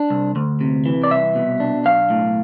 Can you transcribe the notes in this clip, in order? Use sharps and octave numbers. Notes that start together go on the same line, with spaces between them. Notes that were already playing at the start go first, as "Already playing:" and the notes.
Already playing: D4
C2
D2
C3
E3
D5
C2 E5
B2
D4
B1 F5
A2